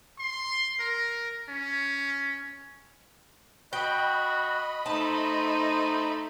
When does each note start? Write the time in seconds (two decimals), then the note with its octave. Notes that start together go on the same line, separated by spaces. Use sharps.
0.19 C6
0.80 A#4
1.49 C#4
3.73 F#4 D#5 G5 B5
4.86 A3 D#4 C5 A5